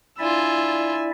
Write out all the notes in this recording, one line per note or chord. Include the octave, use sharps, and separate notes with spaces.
D4 E4 F4 D5 E5 G#5 E6